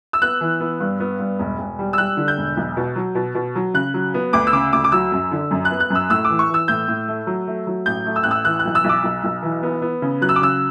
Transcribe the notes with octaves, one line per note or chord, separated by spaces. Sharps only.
E6
B3 F#6
E3
B3
G2
B3
G2
E1
E1
G3
E6
G3 F#6
D3
G6
E1
B1
B2
F#3
B2
B2
F#3
C#3 F#6
F#3
B3
D2 D6
E6
C#3 D6
D2 D6
D6
F#3 E6
F#2
D3
F#2
F#6
B3
F#6
F#2
E6
A2 E6
D6
E3
C#6
E3 E6
A2 G6
A2
A3
F#3
A3
F#3
A1 G6
A3
E6
A1 F#6
E6
E3 F#6
F#6
B1
E6
B1
D6
B1
B1
E3
B3
B3
C#3
F#3 F#6
E6
D6
C#3 E6